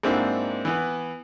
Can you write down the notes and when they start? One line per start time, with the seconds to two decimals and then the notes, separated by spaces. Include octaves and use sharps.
0.03 G#2 A#3 C4 D4 E4 F#4
0.65 E3 B3